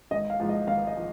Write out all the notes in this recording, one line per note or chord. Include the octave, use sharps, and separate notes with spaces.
G#1 D#5
F5
G#2 F3
D#5
G#1 F5
D#5
F3